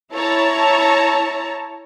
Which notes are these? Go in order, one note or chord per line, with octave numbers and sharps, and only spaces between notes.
E4 C#5 A5 A#5